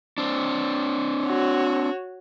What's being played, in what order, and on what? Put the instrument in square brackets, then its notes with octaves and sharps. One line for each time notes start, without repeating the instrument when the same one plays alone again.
[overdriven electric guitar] C4 D4
[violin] F#4 C#5